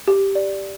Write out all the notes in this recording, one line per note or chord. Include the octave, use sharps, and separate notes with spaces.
G4
D5